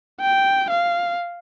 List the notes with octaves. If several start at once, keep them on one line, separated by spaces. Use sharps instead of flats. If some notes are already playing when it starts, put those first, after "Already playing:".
G5
F5